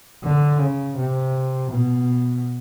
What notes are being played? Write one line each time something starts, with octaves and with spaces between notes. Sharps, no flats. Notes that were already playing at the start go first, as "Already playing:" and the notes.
D3
C#3
C3
B2